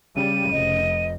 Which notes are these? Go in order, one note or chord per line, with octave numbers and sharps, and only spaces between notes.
C#3 G3 D#7
F1 D#5